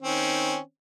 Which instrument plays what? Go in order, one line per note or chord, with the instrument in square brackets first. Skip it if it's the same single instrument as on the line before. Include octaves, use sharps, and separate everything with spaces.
[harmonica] D#3 C4 C#4